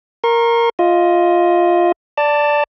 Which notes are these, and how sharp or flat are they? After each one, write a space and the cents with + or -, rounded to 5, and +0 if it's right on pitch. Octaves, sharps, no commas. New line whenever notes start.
A#4 +0 C#6 -45
F4 +0 D#5 +15
D5 -5 A5 +15